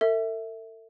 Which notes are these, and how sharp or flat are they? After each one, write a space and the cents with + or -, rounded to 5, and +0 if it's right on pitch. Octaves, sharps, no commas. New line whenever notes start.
A4 +45 E5 -10